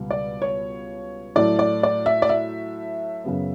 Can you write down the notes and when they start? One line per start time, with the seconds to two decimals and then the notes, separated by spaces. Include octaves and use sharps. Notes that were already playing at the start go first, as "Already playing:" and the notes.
Already playing: C#2 B2 G3 B3
0.11 D5
0.42 C#5
1.36 A2 F#3 A3 D5
1.59 D5
1.83 D5
2.06 E5
2.22 D5
2.29 E5
3.24 F#2 C#3 F#3 B3